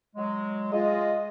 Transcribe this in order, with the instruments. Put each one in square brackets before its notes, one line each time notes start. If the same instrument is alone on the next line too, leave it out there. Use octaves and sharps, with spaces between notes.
[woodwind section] F#3 G#3
[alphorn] G#3 [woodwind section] F4 D#5